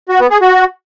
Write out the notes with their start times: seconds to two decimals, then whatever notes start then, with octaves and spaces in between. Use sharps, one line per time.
0.09 F#4
0.20 B3
0.30 G#4
0.41 F#4